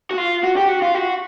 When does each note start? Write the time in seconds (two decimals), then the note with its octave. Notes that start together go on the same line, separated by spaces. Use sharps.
0.11 F#4
0.18 F4
0.44 F#4
0.57 G4
0.69 F#4
0.82 F4
0.95 F#4